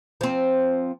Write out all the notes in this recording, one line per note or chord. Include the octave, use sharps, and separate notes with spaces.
F3 C4